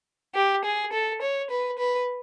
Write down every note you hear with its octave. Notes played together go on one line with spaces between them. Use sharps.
G4
G#4
A4
C#5
B4
B4